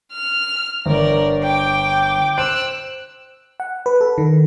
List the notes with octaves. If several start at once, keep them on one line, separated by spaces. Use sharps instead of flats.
F6
G1 A#4 D5
G5 D6
C5 E6 F#6 D7
F#5
B4
A4
D#3